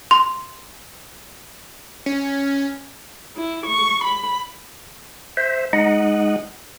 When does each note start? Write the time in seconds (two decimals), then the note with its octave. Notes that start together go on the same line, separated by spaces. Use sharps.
0.11 C6
2.06 C#4
3.36 E4
3.66 C#6
4.05 B5
5.37 C5 E5
5.73 G#3 D#4 D#5 F#5